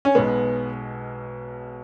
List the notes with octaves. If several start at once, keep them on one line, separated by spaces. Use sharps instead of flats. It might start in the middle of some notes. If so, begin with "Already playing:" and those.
C#4
B1 B2 G#3 B3